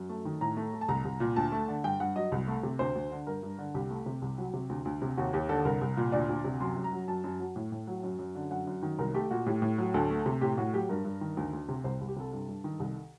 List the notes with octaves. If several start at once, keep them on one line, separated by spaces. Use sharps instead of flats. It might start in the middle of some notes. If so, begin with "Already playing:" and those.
Already playing: F#2
A3
D#3
A2 A#5
A3
A3
A5
C2 A#5
C2
A#2
D2 A5
A3
D3
G2 G5
G2 F#5
F#3 D#5
C2
A3
C3
D2 C5
D2
D3
G2 A#4
G2
D3
C2 G4
A3
C3
C2
F#3
C3
D2
D2
C3
D#2 F#4
D#2 G4
D3 A4
C2 A#4
C2
A#2
D2 D5
D2
C3
F#2 C6
F#2
A#5
F#3
F#2 A5
F#2
F#3
A2
A2
F#3
F#2
F#2
D3
F#2 F#5
F#2
D#3
C2 A#4
A3 G4
A#2 F#4
A2 G4
A2
F#3
D2 A4
A3
C3
A2 G4
A2 F#4
F#3 G4
G2 A#4
G2
D#3
D2
D2
C3
C2 C5
C2
G4
C3 A4
G2
G2
D#3
C2